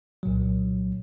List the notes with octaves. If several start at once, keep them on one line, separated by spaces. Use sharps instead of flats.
C2 A#2 F#3